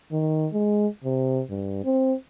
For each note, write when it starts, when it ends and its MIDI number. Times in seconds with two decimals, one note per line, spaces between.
0.12 0.47 51
0.53 0.87 56
1.04 1.42 48
1.50 1.84 43
1.84 2.14 60